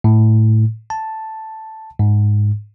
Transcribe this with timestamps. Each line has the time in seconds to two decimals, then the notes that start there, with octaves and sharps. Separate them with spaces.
0.04 A2
0.90 A5
1.99 G#2